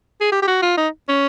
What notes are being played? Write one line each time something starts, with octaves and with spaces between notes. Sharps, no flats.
G#4
G4
G4
F#4
F4
D#4
C#4